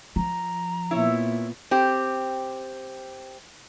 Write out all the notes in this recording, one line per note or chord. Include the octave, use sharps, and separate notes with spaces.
F3 A#5
A#2 B3 E4 C#5
C4 G4